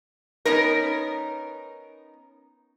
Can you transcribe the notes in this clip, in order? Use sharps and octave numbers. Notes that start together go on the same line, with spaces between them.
B3 C#4 D#4 A#4